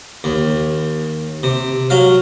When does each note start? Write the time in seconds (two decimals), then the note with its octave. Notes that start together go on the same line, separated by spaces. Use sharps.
0.24 D#2
1.43 C3
1.90 F#3 F5